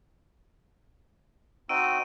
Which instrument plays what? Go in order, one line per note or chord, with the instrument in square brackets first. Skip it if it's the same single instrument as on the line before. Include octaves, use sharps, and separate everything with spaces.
[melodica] C4 D#4 F#4 [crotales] E6 D7 D#7